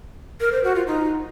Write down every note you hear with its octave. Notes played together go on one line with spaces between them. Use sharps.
A#4
C5
F#4
F4
D#4